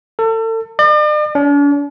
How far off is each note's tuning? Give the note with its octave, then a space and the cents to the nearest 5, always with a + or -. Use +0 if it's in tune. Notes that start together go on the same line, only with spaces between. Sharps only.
A4 +35
D5 +45
D4 -45